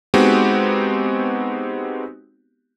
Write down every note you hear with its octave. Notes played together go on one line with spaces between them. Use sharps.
G#3 B3 C4 D#4 F#4 G4